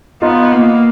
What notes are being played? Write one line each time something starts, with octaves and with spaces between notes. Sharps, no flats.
B3 D#4 F4
A#3